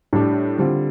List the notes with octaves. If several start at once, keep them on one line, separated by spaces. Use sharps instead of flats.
A2 G3 D4
D3 G3 C4 F4